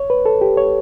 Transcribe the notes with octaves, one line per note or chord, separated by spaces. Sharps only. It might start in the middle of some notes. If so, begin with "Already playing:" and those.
Already playing: C#5
B4
A4
G4
C#5